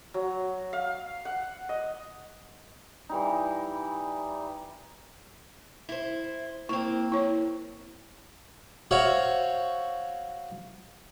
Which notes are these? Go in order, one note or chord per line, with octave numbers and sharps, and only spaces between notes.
F#3
F5
F#5
D#5
E3 G3 D#4
E4 C5
A#3 C4 E4
E4 C#5
F#4 C5 C#5 E5 F5